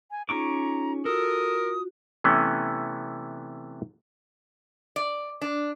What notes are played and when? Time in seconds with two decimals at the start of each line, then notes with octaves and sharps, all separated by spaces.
0.11 G#5
0.29 C#4 D#4 F4 G#4 A#5 C#6 D6
1.05 F4 F#4 A4 A#4 D#6
2.24 C3 E3 A3 B3 C#4
4.96 D5
5.41 D4